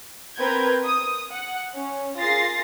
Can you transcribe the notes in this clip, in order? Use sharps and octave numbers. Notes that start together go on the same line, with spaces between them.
B3 C4 A#4 B4 G6 G#6
D#6
F#5
C#4
F4 G#4 A#4 A6 A#6 C7